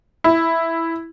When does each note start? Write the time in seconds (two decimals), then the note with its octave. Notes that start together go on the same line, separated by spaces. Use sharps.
0.24 E4